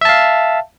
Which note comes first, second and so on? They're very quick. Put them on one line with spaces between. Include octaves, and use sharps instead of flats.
E5 A5 F5